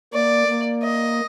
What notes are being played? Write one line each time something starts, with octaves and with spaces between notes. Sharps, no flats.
A#3 D5
A#3
D#5